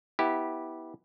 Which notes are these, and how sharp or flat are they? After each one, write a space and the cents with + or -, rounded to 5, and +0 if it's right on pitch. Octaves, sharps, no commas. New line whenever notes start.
B3 +0 E4 -20 G4 +0